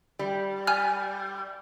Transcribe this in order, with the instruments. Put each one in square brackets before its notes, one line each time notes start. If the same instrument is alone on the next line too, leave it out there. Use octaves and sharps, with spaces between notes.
[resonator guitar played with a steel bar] G3
[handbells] G#5 F6